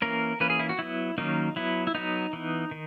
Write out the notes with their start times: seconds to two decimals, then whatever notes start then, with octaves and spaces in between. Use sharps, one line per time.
0.02 E3 A#3 C#4 A#4
0.40 E3 A#3 C#4 B4
0.50 G#4
0.59 E4
0.69 F#4
0.79 F#3 B3 E4
1.18 D#3 F#3 A#3 C#4 D#4
1.56 F#3 B3 E4
1.87 E4
1.95 F#3 B3 D#4
2.33 E3 B3
2.71 D#3